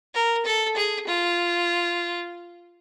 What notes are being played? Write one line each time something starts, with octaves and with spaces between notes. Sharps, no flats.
A#4
A4
G#4
F4